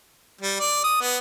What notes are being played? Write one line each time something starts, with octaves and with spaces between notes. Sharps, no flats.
G3
D5
D#6
B3